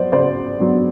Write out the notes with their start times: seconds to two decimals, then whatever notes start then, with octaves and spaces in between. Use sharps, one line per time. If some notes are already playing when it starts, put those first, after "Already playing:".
Already playing: F#3 B3 C5 D5
0.12 C#3 C5 D5
0.60 F#3 B3 D4